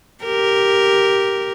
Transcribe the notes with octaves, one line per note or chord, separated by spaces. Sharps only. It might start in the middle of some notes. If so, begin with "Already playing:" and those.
G4 A#4